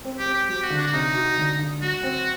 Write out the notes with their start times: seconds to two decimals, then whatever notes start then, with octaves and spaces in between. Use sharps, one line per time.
0.04 C4
0.19 G4
0.26 C4
0.34 G4
0.49 F#3 G4
0.63 F#4
0.70 D3
0.78 D4
0.87 F#4
0.93 C3 D#4
1.15 F#4
1.37 D3
1.59 D3
1.82 F#3 F#4
2.03 C4